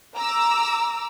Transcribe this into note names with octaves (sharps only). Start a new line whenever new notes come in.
A#5 D6 E6